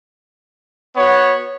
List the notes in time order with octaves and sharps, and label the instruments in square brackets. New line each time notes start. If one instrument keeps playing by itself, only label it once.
[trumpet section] B3 F#4 C#5 F#5